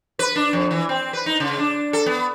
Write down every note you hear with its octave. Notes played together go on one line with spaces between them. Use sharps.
B4
D4
F2
E3
C4
B4
D#4
C#3
D4
A4
B3